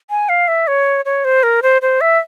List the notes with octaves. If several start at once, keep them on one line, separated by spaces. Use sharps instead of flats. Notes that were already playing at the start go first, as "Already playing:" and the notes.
G#5
F5
E5
C#5
C#5
C5
A#4
C5
C5
E5